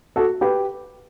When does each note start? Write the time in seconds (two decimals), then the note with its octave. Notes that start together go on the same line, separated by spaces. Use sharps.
0.16 F#4 A4
0.41 G4 B4